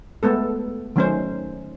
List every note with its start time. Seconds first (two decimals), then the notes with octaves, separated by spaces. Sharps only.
0.23 G#3 A3 B3 A4
0.96 D#3 F#3 A3 C#4 D#4 C5